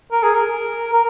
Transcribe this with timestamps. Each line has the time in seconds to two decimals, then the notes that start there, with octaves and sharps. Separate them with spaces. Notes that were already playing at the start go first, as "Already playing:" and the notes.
0.12 A#4
0.23 G#4
0.34 A#4
0.93 A#4